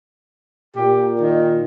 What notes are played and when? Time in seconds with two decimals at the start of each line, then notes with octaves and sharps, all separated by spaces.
0.76 A#2 G4
1.21 D#3